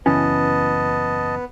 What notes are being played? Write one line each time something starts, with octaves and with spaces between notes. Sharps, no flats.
F#1 E3 B3 C#4 D#5 A5